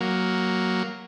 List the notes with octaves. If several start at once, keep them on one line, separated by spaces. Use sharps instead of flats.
F#3 A#3